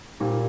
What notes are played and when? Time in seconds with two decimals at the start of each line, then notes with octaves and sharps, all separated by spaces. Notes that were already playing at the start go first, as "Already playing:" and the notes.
0.20 A#2 G3 C4